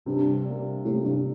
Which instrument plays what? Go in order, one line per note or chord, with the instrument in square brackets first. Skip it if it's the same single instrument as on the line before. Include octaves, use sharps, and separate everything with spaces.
[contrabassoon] G2 [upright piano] C3
[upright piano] G3 A#3
[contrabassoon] A2 [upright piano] C3
[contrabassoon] G2